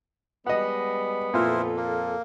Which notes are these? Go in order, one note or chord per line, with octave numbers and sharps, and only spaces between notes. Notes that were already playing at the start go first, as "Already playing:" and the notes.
G3 G#3 B3 D#5 F#5
F2 A#2 E4 F4 A4 A#4 C5
A#3